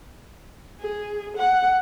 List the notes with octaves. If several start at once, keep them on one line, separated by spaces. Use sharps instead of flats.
G#4
F#5